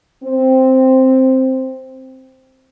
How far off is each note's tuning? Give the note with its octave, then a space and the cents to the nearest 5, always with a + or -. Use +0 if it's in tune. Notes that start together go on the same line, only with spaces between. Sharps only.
C4 +0